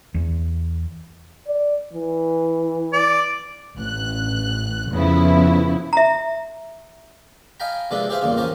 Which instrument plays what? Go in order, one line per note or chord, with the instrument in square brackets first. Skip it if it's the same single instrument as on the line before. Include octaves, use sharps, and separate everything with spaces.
[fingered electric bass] E2
[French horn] D5
E3
[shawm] D5
[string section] A1 F#6
F2 C#3 F3 B3 E4
[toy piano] E5 A#5
[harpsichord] D#5 F5 G5 G#5 A#5 B5
C3 F3 G#3 D4 A4 B4
G4 G#4 B4 C5 E5 F5
A1 E2 G2 A#2 C#3 F4
F3 C#4 G4 A#4 D#5